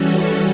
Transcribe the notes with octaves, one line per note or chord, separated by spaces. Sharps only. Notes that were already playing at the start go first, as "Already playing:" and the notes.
Already playing: E3 G3 C#4 F#4 A4